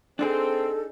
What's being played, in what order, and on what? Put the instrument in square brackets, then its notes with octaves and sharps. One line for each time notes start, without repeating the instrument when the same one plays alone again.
[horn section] C4 [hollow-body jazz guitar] D4 D#4 G#4 [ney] A4